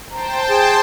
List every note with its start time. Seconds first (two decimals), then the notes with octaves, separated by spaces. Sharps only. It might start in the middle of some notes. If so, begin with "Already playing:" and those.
0.11 C5 G5 A5 A#5
0.49 G#4